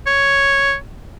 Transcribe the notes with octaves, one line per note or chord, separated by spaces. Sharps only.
C#5